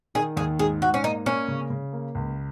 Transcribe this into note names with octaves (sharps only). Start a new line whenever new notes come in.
D#3 G#4
D#2 G#4
G#2 G#4
G#2 F#4
C#4
A#3 D#4
A#3 C#4
C#3
C#3
A#3
C#2